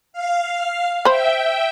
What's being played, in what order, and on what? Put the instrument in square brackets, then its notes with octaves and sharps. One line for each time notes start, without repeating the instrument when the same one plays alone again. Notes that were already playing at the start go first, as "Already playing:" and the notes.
[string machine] F5
[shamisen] C5 B5 [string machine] E5 G5